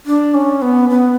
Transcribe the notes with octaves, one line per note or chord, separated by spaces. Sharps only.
D4
C#4
B3
B3